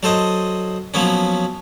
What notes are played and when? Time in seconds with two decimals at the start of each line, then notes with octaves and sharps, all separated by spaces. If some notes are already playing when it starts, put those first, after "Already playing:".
0.03 F#3 A4 C5 D#5 D#6
0.94 F3 F#3 A#3 B3 C#4